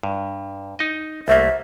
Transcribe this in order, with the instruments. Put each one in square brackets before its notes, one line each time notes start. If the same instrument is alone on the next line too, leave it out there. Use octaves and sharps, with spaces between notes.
[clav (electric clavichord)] G2
D#4 D#5
[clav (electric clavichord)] C2 A3 A#3 [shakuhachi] E5